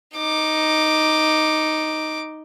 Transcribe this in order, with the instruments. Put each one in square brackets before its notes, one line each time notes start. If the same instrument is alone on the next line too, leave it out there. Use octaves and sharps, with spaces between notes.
[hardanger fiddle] D#4 D6